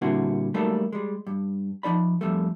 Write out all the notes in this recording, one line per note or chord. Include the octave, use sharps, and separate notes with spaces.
A#2 D3 G3 C4 E4 F#4
F#3 G3 A3 A#3 D#4 A4
G3 G#3
G2
F3 D#4 D5 B5
F2 G3 A3